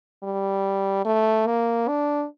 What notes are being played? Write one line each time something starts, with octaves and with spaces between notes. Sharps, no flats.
G3
A3
A#3
D4